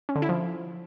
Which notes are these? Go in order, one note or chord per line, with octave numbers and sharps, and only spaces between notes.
C#4
D3
E4
F3